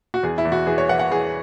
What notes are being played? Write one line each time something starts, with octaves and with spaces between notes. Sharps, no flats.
F#4
E2 G#4
E4
E2
F#4
E3 G#4
C#5
E3 F#5
F#5
E3 G#4